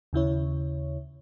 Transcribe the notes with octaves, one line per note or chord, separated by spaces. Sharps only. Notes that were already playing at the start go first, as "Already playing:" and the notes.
D#2 C#3 E4 C#5